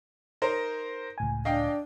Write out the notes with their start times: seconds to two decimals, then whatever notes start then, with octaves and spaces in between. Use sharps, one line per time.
0.42 D#4 A#4 C5
1.18 C#2 A2 G#5
1.45 D4 D#5 F5 G5